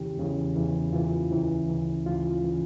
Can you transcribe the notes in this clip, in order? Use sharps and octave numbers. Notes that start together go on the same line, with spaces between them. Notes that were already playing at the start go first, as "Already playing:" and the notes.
Already playing: E2 C#3 E3 G4
E2 C#3 E3
E2 C#3 E3
E2 C#3 E3 F4
D2 C#3 E3 E4
D2 C#3 E3
D2 C#3 E3 F4
C#3 E3